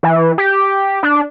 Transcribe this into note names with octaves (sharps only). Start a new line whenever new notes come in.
E3
G4
D4